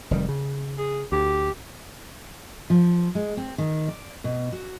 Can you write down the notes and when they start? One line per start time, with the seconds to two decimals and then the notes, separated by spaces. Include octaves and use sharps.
0.11 F1 D#3 G3
0.29 C#3
0.78 G#4
1.12 D2 G4
2.70 F3
3.15 G#3
3.37 C4
3.58 D#3
3.88 D5
4.24 B2
4.52 F#4